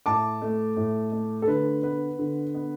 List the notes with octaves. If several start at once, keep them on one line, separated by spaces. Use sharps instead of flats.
A2 A5 D6
A3
A2
A3
A4
D3 B4
B3 B4
D3
B3